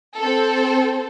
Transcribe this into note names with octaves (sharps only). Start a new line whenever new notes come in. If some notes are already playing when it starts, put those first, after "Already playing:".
C4 A4